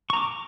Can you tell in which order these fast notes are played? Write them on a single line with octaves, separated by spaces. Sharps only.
C#6 A#5 D6